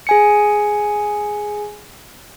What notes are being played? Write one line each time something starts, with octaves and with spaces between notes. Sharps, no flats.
G#4 G#5 C#7